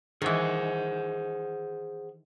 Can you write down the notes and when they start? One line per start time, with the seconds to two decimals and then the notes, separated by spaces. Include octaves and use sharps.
0.22 D#3 E3 G#4 C5 F#5